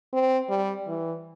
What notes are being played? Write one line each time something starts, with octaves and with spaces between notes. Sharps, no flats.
C4
G3
E3